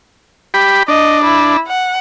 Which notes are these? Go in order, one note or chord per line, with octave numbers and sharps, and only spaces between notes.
G4 B5
D4 D#5
E4
F#5